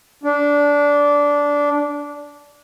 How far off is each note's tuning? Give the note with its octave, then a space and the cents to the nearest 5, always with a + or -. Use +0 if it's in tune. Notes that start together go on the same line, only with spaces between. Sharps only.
D4 -15